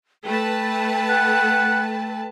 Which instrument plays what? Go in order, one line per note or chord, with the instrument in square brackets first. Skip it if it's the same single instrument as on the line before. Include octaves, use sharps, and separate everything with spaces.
[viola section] A3 B4 A5 [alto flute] G5
[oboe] F#5